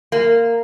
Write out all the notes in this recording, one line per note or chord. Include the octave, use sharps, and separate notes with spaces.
A#3